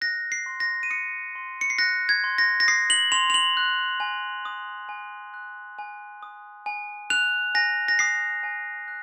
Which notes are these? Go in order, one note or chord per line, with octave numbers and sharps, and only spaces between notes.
F#6 A#6
C7
C6
A#6
D#7
D#6 C#7
C6
C#7
C7
F#6 A#6
G#6
C6
A#6
A#6
D#6 C7
F#7
C6 F7
F7
F#7
F#6
G#5
D#6
G#5
F#6
G#5
D#6
G#5
F#6 F7
G#5 A#6
A#6
D#6 C7
G#5
F#6